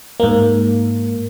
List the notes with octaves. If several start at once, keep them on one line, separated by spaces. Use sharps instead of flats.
G#2 A#3